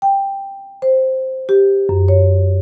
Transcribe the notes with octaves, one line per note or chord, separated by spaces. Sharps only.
G5
C5
G4
F#2
C#5